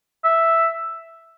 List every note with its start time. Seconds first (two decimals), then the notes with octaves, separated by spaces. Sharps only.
0.24 E5